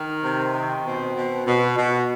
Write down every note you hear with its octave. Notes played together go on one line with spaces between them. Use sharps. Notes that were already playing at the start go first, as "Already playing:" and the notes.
Already playing: D#3
C3
D#3
B2 C4
B2
B2
B2